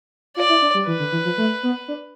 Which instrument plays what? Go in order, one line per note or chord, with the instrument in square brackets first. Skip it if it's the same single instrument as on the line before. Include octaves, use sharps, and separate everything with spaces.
[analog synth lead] F4 [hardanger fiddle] D5
[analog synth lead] E4
D4
G3
[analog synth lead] E3 [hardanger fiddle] B4
[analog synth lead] D3
E3
F3
A3
B3
D4